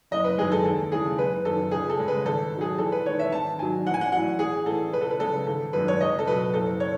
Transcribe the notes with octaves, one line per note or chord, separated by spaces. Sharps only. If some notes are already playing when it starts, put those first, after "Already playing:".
F#1 D#5
B4
F#2 D#3 G#3 G#4
A4
D#2 A4
C#3 E3 G#3 G#4
F#1 B4
F#2 D#3 A4
C#2 G#4
A4
C#3 G#3
B4
G#1 A4
G#2
F#3 G#4
E2 A4
B4
D#3 G#3 C#5
E5
G#1 A5
G#2 D#3 F#3 G#5
A1 F#5
G#5
F#5
A2 F#3 F#5
A1 G#4
A2 E3 A4
C#2 B4
A4
B4
C#3 G#3 A4
G#1 A4
F#2 D#3 G#3 B4
C#5
C#2 D#5
A4
B2 F#3 B4
F#1 A4
C#5